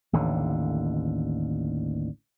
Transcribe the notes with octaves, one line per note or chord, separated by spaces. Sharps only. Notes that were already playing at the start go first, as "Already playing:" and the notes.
A1 D#2 D3